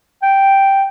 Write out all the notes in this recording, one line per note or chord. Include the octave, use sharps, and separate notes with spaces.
G5